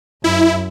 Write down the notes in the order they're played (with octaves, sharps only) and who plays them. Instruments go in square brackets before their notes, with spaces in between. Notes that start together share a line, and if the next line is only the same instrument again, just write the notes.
[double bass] F#2 [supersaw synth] E4